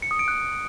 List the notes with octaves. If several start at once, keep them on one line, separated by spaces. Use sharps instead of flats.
C#7
D#6
D7
F#6